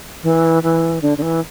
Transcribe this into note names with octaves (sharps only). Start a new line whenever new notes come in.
E3
E3
D3
D3
E3